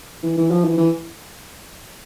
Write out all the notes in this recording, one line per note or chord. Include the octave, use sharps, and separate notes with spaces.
E3
E3
F3
E3
E3